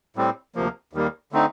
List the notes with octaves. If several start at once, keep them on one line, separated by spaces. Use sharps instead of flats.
A2 G3 C4
D2 C3 F3 A#3
D#2 D#3 G3 A#3
D3 A3 C4 D#4